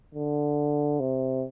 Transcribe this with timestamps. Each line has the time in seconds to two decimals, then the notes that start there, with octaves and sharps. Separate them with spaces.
0.14 D3
1.00 C3